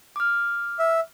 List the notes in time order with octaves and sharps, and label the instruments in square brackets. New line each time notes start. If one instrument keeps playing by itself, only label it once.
[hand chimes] D6 F6
[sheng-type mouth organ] E5